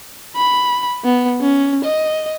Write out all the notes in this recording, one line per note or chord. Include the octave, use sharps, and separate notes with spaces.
B5
B3
C#4
D#5